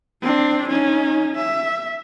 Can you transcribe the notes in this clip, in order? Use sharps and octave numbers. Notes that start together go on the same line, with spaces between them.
C4 D4
C#4 D#4
E5